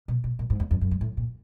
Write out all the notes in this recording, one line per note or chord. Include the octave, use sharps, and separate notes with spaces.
B2
B2
A#2
G#2
E2
F2
F#2
G2
A2
A#2